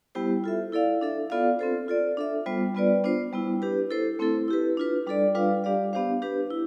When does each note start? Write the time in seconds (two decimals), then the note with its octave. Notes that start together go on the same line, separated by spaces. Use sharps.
0.15 G3 B3 E4 G4 C5
0.44 F4 A4 E5
0.72 E4 A4 D5 F5
1.01 D4 A4 E5
1.30 B3 F4 A4 D5 F5
1.59 C4 F4 A4 C5
1.88 F4 A4 D5
2.17 D4 A4 E5
2.46 G3 B3 F4 C5
2.75 G3 B3 F4 B4 D5
3.04 B3 D4 F4 C5
3.33 G3 B3 E4
3.62 D4 G4 B4
3.90 E4 A4 C5
4.19 A3 C4 E4 A4
4.48 E4 G4 B4
4.77 D4 F4 B4
5.06 G3 D4 A4 D5
5.35 G3 D4 F4 B4 F5
5.64 G3 D4 G4 D5 F5
5.93 B3 D4 G4 C5 F5
6.22 D4 G4 B4
6.50 E4